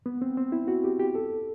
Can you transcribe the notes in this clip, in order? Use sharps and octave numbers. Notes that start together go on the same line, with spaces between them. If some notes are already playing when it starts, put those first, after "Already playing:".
B3
C4
C4
E4
F#4
G4
G4
A4